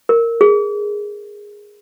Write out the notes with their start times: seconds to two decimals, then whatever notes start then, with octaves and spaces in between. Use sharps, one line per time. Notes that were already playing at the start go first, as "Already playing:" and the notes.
0.09 A#4
0.41 G#4